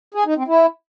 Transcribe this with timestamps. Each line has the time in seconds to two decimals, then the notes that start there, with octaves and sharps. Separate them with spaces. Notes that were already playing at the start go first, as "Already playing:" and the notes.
0.14 G#4
0.25 D#4
0.37 C4
0.48 E4